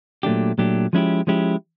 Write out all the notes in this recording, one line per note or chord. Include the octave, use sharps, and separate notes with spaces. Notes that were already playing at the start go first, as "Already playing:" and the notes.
A#2 F#3 A3 D4 G4
A#2 F#3 A3 D4 G4
F3 G#3 C#4 E4 G4
F3 G#3 C#4 E4 G4